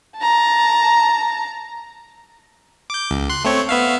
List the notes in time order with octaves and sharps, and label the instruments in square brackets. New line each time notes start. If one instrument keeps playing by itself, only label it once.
[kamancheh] A5 A#5
[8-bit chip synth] D6 G6
C#2
C6 F#6
A3 C4 C#5
B3 E5 F5